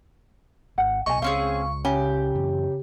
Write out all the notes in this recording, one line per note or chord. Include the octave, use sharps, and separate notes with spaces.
G#1 F#5
C2 B2 D#5 G#5 C#6
C#2 C4 C#4 G#4 F5
C#3 G4 G#5
F#2 E3